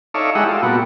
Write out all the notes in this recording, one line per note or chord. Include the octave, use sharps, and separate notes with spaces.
D#4 A4 C#5 D5 E5 F5
G#3 E4 G4 D#5 E5 F#5
F4 A4
A#2 G3 B3 F#4